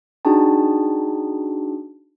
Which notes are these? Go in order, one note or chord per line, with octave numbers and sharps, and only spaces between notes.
D4 D#4 F#4 G#4 G5 A5